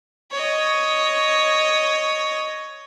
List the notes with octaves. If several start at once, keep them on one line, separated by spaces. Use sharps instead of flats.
C#5 D#5